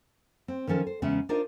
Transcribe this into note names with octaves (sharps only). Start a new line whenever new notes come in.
C4
D#3 F3 C#4 A4
C5
E2 C#3 G#3 B3 C#4 E5
D4 D#4 F4 A#4 C5 D#5